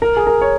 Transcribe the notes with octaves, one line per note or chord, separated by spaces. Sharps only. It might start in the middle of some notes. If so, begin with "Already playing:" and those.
A#4
G#4
A#4
C#5